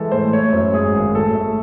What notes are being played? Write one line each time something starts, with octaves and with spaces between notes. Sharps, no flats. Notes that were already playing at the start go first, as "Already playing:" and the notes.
Already playing: E3 G#3 A4
A2 C5
A3 C#5
F#2 C5
G#2 G#4
G#1
A2 A4
A3